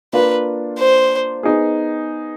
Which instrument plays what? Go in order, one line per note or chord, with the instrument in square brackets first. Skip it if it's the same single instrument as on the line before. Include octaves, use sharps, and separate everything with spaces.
[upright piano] A#3 D4 F4 [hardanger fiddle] B4
[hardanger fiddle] C5
[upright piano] B3 D#4 G#4